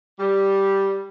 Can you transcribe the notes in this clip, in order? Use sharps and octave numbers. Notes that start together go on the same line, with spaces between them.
G3